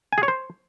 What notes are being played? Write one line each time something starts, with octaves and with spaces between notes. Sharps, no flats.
G#5
G#4
C#5
C5